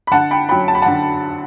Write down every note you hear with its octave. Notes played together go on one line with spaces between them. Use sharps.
B5
D3 F#5 A5
G5 B5
F#3 C#4 G5 B5
A5
B5
D3 F#5 A5